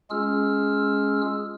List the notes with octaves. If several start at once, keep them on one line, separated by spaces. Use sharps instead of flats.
G#3 C#4 F4 G#4 E6 F6